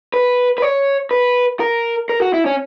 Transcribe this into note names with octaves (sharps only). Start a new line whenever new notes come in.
B4
B4
C#5
B4
A#4
A#4
F#4
E4
C#4